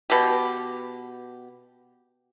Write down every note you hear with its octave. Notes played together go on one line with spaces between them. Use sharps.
B2 G4